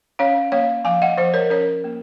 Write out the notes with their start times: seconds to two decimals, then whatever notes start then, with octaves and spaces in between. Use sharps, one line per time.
0.19 C#4 C#5 F5
0.52 A#3 C#5 F5
0.84 F3 F5 G#5
1.02 D#5 F#5
1.17 F3 C5 D#5
1.34 A#4 C#5
1.50 C#4 A#4 C#5
1.84 A#3